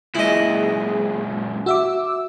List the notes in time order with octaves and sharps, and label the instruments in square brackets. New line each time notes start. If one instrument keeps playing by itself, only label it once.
[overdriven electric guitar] C#2 A#2 [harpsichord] E4 D#5 [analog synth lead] G#4
[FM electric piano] F#4 E5 D6 [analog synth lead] E6